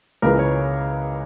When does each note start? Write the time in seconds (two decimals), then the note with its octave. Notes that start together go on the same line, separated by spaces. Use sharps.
0.22 C#2 C#3 E3 A#4
0.39 C#5